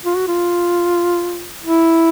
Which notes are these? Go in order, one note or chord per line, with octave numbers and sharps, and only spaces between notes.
F4
F#4
F4
E4